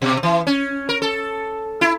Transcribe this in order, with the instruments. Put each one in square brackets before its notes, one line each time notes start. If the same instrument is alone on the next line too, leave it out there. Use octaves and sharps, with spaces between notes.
[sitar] B2
E3
C#4
A#4
A4
E4